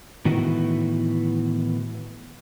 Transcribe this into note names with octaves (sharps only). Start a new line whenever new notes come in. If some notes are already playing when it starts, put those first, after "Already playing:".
A2 D#3 E3 B3 F#4